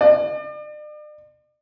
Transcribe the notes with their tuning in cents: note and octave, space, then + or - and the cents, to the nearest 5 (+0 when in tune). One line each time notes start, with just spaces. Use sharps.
D5 +40